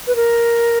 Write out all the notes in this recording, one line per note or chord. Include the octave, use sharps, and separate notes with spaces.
B4
A#4